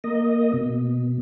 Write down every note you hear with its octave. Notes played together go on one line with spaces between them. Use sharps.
A#3 D#5
B2